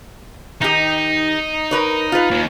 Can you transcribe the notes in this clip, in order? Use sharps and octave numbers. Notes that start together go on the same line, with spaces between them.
D#3 D#4 G4
A#4 B4 C#5
F4 B4
D#2